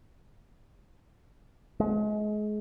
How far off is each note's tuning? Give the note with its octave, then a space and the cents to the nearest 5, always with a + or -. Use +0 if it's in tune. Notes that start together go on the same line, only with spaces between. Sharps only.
G#3 +30